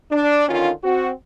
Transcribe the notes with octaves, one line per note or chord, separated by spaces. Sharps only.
D4
D3 D#3 C#4 F4
C4 F#4